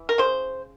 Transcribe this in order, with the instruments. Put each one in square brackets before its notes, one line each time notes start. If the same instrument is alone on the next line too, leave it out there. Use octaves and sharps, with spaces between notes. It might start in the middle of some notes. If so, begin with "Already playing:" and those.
Already playing: [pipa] E3
A#4
C#3 C5